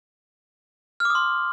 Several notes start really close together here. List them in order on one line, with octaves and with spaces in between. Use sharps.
F6 D6 D#6 C6